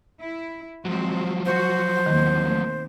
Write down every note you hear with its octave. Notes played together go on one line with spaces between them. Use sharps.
E4
F3 F#3 G#3 C4 C5
F#4 C5
D#2 B2 D#3 C4
A3